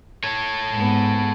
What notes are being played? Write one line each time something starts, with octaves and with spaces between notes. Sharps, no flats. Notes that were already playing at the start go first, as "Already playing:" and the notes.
A4 C#5
G#2 B3